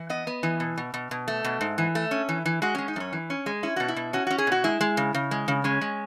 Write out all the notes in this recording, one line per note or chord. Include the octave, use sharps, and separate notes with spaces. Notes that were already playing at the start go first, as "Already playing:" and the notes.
Already playing: E3
B3 D#5
B3
E3
B2
B2
B2
B2
A3
B2
G#2
E3
A3
C#4
E3
E3
G#3 F#4
G#3 C#4
D#4
F#2 C#4
E3
C#4
G#3
C#4 E4
B2 F#4
E4
B2
C#4 F#4
C#4 F#4
G#4
B2 F#4
G#3 E4
G#3
C#3
C#3
G#3
C#3
G#3 C#4
G#3